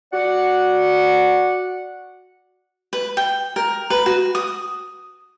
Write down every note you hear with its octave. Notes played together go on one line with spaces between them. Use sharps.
F#4 D5 F#5
B4
G5
A#4
B4
F#4
D#6